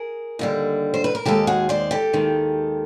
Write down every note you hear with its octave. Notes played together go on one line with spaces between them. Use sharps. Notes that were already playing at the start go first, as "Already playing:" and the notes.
Already playing: G#4 A#4
D#2 D3 G3
C5
B4
A#4
D#2 D#3 G#3 G4 A4
F#4 G#4
C5 D5
G4 A4
D#2 D#3 G#3